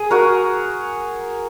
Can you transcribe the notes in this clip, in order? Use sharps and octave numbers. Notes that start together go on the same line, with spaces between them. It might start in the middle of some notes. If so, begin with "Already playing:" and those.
Already playing: G#4
F#4 A#4